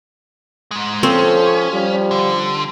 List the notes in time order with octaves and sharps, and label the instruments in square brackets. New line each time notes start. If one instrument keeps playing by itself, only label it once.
[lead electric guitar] G#2 G#3
[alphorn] F3 [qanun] C4 [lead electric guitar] C#4 [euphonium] A4
[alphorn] F3 [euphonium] G3
[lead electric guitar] D3